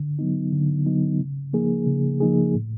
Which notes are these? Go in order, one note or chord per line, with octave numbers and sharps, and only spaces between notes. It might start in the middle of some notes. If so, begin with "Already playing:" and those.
Already playing: D3
F#3 B3 D#4
D3
F#3 B3 D#4
C#3
F3 A#3 D#4 G#4
C#3
F3 A#3 D#4 G#4
A2